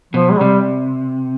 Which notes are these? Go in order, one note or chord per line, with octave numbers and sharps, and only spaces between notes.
B2 F3
G#3
C3 G3